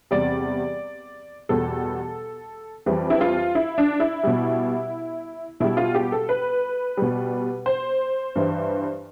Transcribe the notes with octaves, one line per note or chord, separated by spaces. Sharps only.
E2 C3 G3 D5
E2 B2 G3 A4
F2 E3 G3
E4
F4
E4
D4
E4
B2 G3
B2 G3 E4
F4
G4
A4
B4
B2 G3
C5
G2 E3 G3